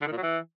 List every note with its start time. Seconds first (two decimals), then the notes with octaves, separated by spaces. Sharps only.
0.01 D3
0.07 D#3
0.12 A#2
0.17 F#3
0.23 E3